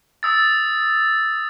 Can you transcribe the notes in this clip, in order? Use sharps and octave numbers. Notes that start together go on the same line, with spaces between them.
D#6 E6 A6